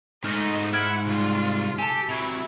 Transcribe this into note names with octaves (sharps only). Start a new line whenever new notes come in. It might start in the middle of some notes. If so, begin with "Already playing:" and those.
G#2 A3 D#4 D#5 F6
E4 F#5 F6 G#6 D7
C2 F4
G4 A4 G#5 A5
C3 F#3 E4 G#6 F7